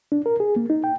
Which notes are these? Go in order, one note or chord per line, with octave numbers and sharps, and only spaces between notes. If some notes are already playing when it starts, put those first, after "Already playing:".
D4
A#4
G#4
A#3
D#4
G5